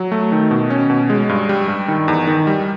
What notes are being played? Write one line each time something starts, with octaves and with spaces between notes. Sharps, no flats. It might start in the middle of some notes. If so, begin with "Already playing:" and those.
Already playing: F#3
A3
D#3
B2
C#4
B2
G#3
G2
G3
G2
D#3
E2
D#3
G3